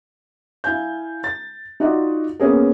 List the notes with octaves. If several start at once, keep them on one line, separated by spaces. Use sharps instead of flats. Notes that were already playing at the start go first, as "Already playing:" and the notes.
E4 F5 G#5 G6
A6
D#4 F4 F#4 D5 D#5 F#5
A#3 B3 C#4 G#4 A#4